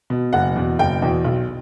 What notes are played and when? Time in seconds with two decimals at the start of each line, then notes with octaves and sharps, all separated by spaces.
0.10 B2
0.33 F#1 F#5
0.56 E2 B2
0.79 F#1 G5
1.02 E2 B2
1.24 B1